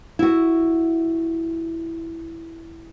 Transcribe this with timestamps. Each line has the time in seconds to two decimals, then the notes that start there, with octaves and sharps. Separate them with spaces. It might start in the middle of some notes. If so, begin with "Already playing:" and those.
0.19 E4 F#4